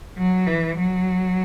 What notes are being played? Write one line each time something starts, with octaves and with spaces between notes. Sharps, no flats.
F#3
E3
F#3